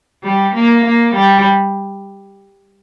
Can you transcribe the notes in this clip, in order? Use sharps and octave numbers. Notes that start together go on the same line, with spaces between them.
G3
A#3
A#3
G3